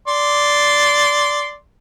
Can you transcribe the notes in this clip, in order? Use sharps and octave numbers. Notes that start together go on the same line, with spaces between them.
D5 C6